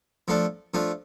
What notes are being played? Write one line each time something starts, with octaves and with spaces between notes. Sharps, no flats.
F3 A3 D4
F3 A3 D4